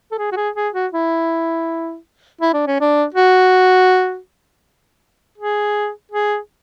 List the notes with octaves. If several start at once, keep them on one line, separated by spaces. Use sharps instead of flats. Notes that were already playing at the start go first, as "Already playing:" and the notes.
A4
G#4
F#4
G#4
G#4
F#4
E4
E4
D4
C#4
D4
F#4
G#4
G#4